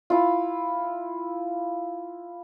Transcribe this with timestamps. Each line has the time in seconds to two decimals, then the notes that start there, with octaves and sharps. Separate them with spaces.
0.10 E4 F4